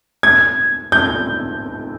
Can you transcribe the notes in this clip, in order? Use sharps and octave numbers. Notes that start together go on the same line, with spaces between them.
G#6
G6